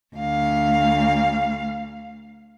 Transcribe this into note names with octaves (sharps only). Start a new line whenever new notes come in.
D2 F5